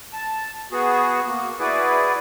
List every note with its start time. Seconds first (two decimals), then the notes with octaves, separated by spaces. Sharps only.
0.13 A5
0.71 B3 F#4 G#4
1.27 A#3 F#4
1.59 E4 F#4 G#4 B4 D5